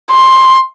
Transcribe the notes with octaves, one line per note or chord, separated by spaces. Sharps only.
C6